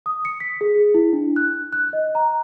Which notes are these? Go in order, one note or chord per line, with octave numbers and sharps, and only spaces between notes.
D#6
C#7
B6
G#4
E4
D4
F#6
F#6
D#5
A#5